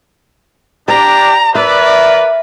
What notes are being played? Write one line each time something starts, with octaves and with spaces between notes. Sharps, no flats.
D4 G4 D5 A#5
A#4 B4 D5 E5